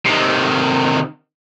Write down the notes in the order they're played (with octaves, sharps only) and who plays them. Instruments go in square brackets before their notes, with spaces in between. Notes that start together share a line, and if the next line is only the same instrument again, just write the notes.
[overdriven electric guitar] C3 D#3